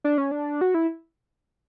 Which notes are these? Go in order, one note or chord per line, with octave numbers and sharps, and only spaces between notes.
D4
C#4
D4
F#4
E4